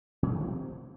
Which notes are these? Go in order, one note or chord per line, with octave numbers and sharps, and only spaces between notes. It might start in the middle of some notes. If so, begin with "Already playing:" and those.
B2
A3
D#3
F3
C3